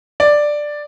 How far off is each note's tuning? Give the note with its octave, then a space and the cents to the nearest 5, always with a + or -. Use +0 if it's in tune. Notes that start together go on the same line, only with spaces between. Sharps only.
D5 +5